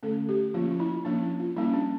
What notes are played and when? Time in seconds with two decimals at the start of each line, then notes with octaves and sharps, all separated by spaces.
0.03 D3 A3 C#4 A4
0.29 G4
0.54 F3 A#3 C#4 F4
0.71 F4
0.80 E4
1.05 F3 A#3 C#4 D4
1.22 E4
1.40 F4
1.57 G3 A#3 C#4 E4
1.74 D4